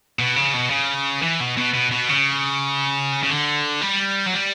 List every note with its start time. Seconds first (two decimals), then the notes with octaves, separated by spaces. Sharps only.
0.19 B2
0.36 C#3
0.54 B2
0.70 C#3
1.22 E3
1.40 B2
1.57 B2
1.74 B2
1.91 B2
2.09 C#3
3.24 C#3
3.30 D3
3.81 G3
4.26 F#3
4.34 G3